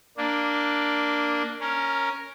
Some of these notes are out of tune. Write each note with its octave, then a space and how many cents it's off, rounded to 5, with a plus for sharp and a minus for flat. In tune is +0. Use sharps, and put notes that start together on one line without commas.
A#3 +0 D4 +0
C#4 +0 A#4 +5